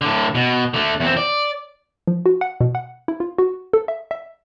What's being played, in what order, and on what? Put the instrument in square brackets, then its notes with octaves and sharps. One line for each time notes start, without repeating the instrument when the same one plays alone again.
[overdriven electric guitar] A2 D3
B2
D3 A3
E2 C4
D5
[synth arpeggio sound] F3
F#4
F#5
B2
F#5
E4
F4
F#4
A4
E5
E5